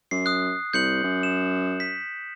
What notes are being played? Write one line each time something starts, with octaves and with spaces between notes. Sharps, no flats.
F#2 C7
D#6 F#6
C2 G6 C#7 F#7
F#2
E7
B6